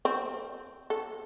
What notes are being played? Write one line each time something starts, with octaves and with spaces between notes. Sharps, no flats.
C4
A4